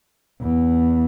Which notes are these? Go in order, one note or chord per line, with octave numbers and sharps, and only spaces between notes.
E2